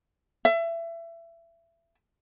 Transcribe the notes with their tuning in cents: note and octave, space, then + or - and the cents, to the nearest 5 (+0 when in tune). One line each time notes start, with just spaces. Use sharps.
E5 +25